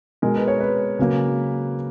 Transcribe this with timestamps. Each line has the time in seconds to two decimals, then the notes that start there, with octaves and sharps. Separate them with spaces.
0.22 B2 G#3 A#4
0.36 B4
0.48 C#5
0.61 B4
0.99 C#3 F#3 A#3